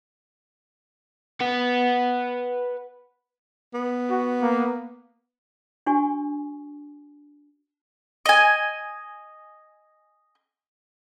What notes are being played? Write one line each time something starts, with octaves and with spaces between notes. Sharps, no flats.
B4 F#5
B3
F#4
A#3
D4 F#4 G#5 C#6
D#5 G#5